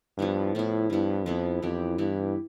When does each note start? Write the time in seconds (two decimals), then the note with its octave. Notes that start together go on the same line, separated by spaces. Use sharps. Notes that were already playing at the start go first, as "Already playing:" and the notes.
0.18 G2 F3 B3 E4
0.54 A2 F3 B3 E4
0.90 G2 F3 B3 E4
1.26 F2 F3 B3 E4
1.62 F2 E3 B3 E4 G4
1.98 G2 E3 B3 E4 G4